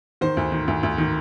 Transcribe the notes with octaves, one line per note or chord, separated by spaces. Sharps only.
D#3 C5
D2
D#3
D2
D2
D#3